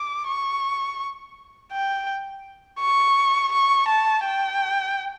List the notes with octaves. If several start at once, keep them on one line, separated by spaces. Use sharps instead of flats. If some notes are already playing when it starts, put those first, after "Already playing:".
Already playing: D6
C#6
G5
C#6
C#6
A5
G5